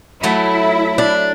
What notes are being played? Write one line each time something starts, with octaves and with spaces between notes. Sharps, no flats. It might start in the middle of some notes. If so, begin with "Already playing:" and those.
F#3 A3 E4
D4